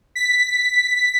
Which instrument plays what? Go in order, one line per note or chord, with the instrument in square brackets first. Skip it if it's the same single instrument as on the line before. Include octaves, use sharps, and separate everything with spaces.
[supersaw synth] B6